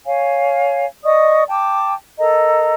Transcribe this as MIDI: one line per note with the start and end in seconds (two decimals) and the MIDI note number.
0.06 0.86 73
0.06 0.86 77
0.06 0.86 80
1.05 1.44 74
1.05 1.44 75
1.05 1.44 85
1.05 1.44 87
1.49 1.93 79
1.49 1.93 81
1.49 1.93 86
2.19 2.74 69
2.19 2.74 70
2.19 2.74 75
2.19 2.74 82